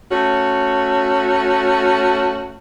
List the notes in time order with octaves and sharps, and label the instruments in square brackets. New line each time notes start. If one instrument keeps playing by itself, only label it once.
[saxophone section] A3 C#4 F#4